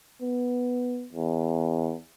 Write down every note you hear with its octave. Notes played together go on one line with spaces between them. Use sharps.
B3
E2